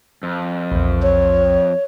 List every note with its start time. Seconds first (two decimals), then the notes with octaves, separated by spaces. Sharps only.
0.23 F2
0.72 A#1 E2
1.03 C#5